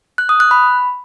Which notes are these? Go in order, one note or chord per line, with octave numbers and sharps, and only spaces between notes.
F#6
D#6
F#6
B5